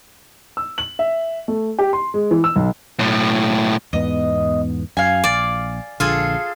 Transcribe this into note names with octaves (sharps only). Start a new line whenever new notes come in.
E6
F#7
E5
A3
G4
C6
G#3
E3
E6
B1
B1 A2
E2 G#2 B3 D#5
F#2 F5 G#5
A#1 D5
A#1 D3 F4 G#4 A4